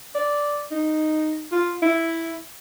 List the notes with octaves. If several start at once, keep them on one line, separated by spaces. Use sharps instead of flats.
D5
D#4
F4
E4